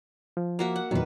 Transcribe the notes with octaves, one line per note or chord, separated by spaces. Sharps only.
F3
A#3 F#4 E5
F#5
E2 A#2 D#3 F#3 B4